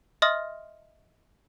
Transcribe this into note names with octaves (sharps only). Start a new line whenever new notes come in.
D#5 E5 C6 D#6 F6 A#6